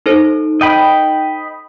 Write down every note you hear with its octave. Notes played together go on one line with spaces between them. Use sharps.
D#4 A4 C5
D#5 G5 B5